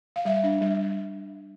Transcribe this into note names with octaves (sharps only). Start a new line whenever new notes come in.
F5
G3 E5
D4
G3